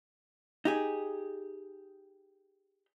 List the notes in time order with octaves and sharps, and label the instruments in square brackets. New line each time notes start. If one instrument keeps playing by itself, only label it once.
[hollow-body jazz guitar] D#4 G4 G#4